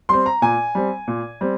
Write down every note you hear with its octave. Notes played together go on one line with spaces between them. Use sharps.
G3 C4 C6
A#5
A#2 G#5
G3 C4
A#2
G3 C4